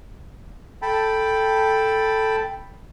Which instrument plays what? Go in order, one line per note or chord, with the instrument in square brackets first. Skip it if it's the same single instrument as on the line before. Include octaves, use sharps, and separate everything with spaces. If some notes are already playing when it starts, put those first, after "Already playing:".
[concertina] A4 G5 A5 B5